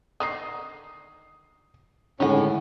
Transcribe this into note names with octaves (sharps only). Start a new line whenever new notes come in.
D3 D#3 D#4 D#6 C7
A2 D3 D#3 G#3 C#4 G4 F#5